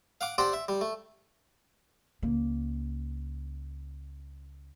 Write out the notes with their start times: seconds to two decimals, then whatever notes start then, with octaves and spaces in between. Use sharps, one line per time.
0.21 F5 F#5 D6
0.38 C4 G4 C5 D5 F#5
0.53 E5
0.68 G3
0.81 A3
2.22 C#2 A#3